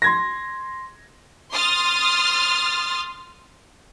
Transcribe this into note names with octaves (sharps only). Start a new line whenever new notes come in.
C6 G#6 A#6
C6 D#6 F6 A6